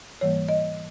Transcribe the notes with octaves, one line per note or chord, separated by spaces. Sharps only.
G#2 E3 G3 A#3 C#5
D#5